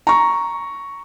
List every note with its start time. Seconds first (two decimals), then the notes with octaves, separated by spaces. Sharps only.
0.07 A#5 C#6